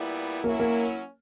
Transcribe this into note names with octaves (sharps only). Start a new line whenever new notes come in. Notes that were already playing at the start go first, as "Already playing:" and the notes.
Already playing: A#2 G3 B3 E4
F#3 A#3 C#4 E4
A#3